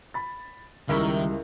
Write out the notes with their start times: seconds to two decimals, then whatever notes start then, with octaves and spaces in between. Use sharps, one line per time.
0.14 B5 A6
0.89 C#2 D#3 G3 E4 A#4 E5 C#6